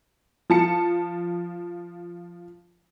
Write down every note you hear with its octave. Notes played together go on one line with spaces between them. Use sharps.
F3 A5 C#7